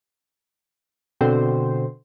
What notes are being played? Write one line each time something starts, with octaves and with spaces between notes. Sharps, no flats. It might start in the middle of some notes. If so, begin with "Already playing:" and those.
B2 D3 C4 C5